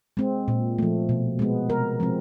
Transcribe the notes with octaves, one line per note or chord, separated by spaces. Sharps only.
G#3 C4
A#2
F3 A3
B2
G#3 B3
C3 A#4
F3 G#3 C4